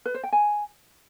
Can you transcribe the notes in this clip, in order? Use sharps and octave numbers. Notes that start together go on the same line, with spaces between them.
B4
C5
G5
G#5